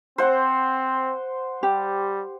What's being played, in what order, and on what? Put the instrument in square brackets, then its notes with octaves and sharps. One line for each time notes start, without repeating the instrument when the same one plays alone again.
[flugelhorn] C4 [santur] C5 F#5
[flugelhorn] G3 [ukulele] G4